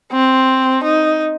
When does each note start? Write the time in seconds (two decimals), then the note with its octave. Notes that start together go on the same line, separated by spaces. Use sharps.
0.12 C4
0.84 D#4